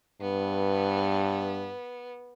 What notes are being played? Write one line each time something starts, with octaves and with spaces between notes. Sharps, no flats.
G2 B3